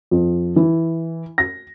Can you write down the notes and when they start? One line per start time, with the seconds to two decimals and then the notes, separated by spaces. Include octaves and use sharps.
0.11 F2
0.56 E3
1.38 A#6